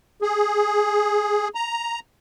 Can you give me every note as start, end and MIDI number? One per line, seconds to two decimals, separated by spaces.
0.22 1.48 68
1.55 1.99 82